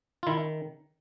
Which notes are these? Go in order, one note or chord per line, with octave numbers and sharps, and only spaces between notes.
F4
D#3 E4